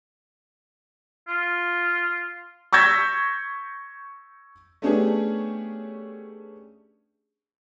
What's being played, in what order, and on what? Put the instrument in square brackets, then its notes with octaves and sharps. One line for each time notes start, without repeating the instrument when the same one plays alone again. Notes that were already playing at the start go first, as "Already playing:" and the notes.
[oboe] F4
[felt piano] C#6 E6 G6 G#6 A#6 B6
[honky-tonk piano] A3 B3 C#4 D4 G4 G#4